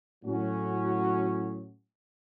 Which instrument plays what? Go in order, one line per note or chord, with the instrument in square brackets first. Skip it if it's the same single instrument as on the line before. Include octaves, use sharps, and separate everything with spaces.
[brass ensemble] A2 F#3 C#4 F#4